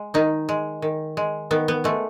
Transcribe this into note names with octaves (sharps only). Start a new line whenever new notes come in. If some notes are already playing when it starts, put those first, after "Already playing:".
Already playing: G#3
D#3 D#4
G#3
D#3
G#3
D#3 B3
B3
G#3 A3